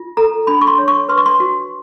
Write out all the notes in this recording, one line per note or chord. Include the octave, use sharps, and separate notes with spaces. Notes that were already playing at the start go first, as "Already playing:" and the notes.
Already playing: F4
A4 A#5
D4 B5
C#6
C6
C#5
C#6
B4 C6
C#6
C6
F#4